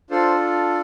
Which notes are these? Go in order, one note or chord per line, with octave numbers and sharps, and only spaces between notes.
D4 F4 A4 C5